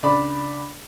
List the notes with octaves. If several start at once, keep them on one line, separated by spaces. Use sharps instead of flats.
C#2 D4 D5 B5